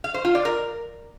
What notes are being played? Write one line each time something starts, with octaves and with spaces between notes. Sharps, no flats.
F5
C5
F4
D5
A#4